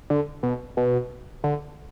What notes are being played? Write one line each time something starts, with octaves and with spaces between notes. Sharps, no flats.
D3
B2
B2
D3